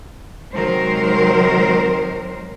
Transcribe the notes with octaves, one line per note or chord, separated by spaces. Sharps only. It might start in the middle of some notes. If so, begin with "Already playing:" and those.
C3 D#3 F#3 G#3 A#4 C5